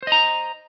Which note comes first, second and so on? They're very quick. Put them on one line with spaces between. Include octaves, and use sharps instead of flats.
C5 D#5 A#5